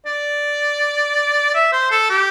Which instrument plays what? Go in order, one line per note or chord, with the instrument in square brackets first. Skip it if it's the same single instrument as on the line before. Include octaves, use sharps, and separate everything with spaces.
[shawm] D5
E5
C5
A4
G4